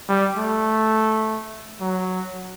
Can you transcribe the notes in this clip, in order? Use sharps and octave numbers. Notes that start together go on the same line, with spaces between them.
G3
A3
F#3